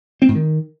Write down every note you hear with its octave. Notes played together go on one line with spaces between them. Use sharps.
C4
G#2
D#3